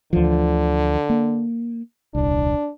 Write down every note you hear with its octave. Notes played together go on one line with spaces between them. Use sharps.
D2 D3 E3 F3
A#3
D#1 C2 D4